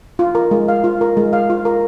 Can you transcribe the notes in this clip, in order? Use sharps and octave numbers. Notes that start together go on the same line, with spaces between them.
F4
A#4
G#3
F5
F4
A#4
G#3
F5
F4
A#4